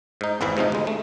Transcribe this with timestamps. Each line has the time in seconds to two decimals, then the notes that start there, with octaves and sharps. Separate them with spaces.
0.21 G#2 D#4
0.41 G#1 E2 G#2 E3 E4 E5
0.57 G#2 C3 F3 D#4
0.72 D2 G#3
0.87 A3